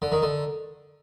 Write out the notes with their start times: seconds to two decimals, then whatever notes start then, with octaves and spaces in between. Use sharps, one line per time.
0.02 D3
0.12 D#3
0.22 D3